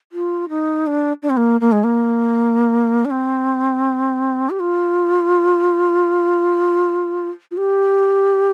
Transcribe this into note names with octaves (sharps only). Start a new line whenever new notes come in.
F4
D#4
D4
D4
C4
A#3
A#3
G#3
A#3
D4
C4
G4
F4
F4
G4